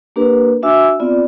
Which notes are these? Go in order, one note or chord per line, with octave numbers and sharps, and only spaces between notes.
A#3 D4 G4 A#4 B4
D4 F#4 E5 G#5 D6 E6
B3 C4 F4 D5